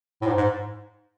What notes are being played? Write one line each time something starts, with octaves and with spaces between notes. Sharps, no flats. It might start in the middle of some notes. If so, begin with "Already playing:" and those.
A2
G#2
G#2